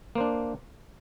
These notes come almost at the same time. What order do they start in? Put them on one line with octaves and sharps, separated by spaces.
A#3 C5 D4